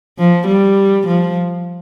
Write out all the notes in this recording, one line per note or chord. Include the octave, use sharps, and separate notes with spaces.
F3
G3
F3